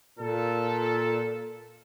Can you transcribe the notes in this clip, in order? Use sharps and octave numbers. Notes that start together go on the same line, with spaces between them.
A#2 A4